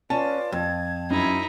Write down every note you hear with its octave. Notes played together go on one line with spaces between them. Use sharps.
C#4 F4 B4 D5 A5
F2 G#6
F#2 D#4 E4